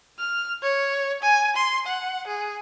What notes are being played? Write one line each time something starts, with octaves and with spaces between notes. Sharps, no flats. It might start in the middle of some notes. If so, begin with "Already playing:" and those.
F6
C#5
G#5
C6
F#5
G#4